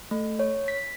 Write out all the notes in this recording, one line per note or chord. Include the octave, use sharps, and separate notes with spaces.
A3
C#5
B6